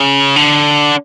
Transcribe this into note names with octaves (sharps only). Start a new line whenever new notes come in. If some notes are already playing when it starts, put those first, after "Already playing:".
Already playing: C#3
D3